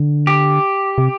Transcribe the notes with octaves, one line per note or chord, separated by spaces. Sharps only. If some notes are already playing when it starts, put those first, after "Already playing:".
Already playing: D3
G4
C3